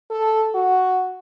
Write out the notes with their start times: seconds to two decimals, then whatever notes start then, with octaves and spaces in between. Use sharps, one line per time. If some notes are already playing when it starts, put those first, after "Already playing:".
0.11 A4
0.55 F#4